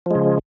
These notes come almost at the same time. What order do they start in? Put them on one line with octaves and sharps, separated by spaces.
F3 G#3 C#3